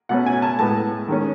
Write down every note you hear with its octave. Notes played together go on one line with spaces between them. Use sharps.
B2 A3 C#4 F#5
G#5
A5
A2 G#3 B3 A5
D#3 G#3 C#4